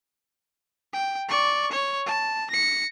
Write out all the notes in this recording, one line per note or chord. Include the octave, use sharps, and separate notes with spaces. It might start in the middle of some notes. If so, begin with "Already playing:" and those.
G5
D5 C#6
C#5
A5
A#6 C#7